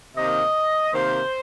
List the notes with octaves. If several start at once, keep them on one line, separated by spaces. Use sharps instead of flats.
C3 D#3 A#3 D#5
C3 D#3 A#3 C5